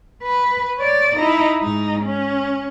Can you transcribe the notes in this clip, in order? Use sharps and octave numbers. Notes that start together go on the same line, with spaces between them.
B4
C#5 D5
D#4 E4
G#2 D#4
C#4